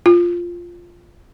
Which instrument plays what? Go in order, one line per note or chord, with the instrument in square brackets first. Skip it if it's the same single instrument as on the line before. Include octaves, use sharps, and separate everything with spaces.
[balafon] F4